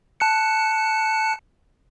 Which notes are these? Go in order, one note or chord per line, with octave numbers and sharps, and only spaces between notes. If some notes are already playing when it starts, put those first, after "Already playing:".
A5 F#6 C#7